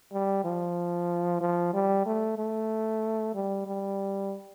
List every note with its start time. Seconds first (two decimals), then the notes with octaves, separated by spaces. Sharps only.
0.13 G3
0.44 F3
1.41 F3
1.74 G3
2.06 A3
2.38 A3
3.35 G3
3.67 G3